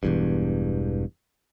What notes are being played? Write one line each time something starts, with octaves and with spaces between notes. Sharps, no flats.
E1 E2 G2